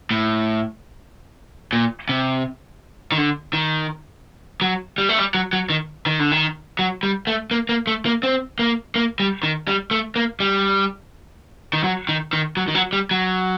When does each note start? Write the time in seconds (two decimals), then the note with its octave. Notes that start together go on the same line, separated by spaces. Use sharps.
0.11 A2
1.73 A#2
2.09 C3
3.12 D#3
3.18 D3
3.53 D#3
4.62 F#3
4.98 G3
5.09 A3
5.19 G3
5.35 F#3
5.53 F#3
5.70 D#3
6.06 D#3
6.19 D3
6.32 D#3
6.79 F#3
7.03 G3
7.27 A3
7.51 A#3
7.69 A#3
7.87 A3
8.06 A#3
8.23 C4
8.59 A#3
8.96 A#3
9.20 G3
9.43 D#3
9.68 G3
9.91 A3
10.16 A#3
10.40 G3
11.73 D#3
11.84 F#3
12.09 D#3
12.33 D#3
12.57 F#3
12.68 D#3
12.75 F#3
12.93 G3
13.11 F#3